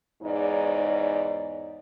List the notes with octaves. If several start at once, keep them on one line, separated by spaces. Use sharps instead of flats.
E2 G#2 D#4 C#5 D5